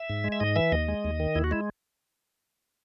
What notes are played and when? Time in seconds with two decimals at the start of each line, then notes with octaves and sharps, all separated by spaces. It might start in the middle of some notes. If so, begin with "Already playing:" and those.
Already playing: E5
0.10 G#2
0.24 G#3
0.32 E5
0.40 G#2 D#5
0.56 E3 E5
0.72 D#2 D#5
0.89 G#3
1.04 D#2
1.20 D#3
1.35 D#2 E4
1.44 F#4
1.51 G#3 E4